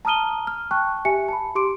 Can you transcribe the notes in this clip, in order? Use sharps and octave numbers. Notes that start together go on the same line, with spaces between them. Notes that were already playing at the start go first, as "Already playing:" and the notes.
A5 A#5 D#6 F6 D#7 G7
F6
G5 A5 C#6 F#6
G4 E5 G#5 C#7
A5 B5
G4 C6 D6 D7